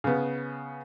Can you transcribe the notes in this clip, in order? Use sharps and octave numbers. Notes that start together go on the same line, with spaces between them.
C#3 B3